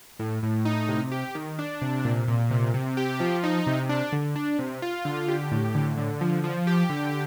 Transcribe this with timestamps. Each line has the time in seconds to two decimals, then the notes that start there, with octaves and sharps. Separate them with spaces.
0.19 A2
0.43 A2
0.65 D#4
0.89 C3
1.12 G4
1.35 D#3
1.59 D4
1.82 C3
2.05 A#2
2.28 A#2
2.51 C3
2.74 C3
2.97 G4
3.20 F3
3.43 D#4
3.67 C3
3.89 D4
4.12 D3
4.36 D4
4.59 C3
4.82 F4
5.05 D3
5.29 G4
5.52 A2
5.75 D3
5.97 D3
6.21 F3
6.44 F3
6.67 G4
6.90 D3